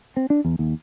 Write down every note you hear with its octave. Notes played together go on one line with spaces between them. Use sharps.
C4
D4
E2
D#2